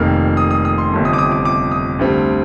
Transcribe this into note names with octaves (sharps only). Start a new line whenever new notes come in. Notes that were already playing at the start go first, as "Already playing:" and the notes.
Already playing: F1 F2 D#3 A#3 F6
D#6
D#6
D#6
C6
G1 F2 C3
D#6
D6
D#6
D6
D6
D#6
D2 D3 G3 C4